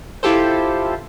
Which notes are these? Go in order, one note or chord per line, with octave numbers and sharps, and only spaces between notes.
E4 F4 G4 A4 C5